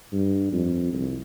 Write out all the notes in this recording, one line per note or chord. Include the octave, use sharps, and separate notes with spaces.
G2
F2
C2